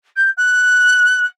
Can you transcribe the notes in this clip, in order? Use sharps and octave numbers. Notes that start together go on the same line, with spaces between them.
G6
F#6